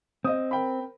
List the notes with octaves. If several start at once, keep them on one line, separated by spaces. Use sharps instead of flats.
C4 D#5 D#6
A#4 G5 B5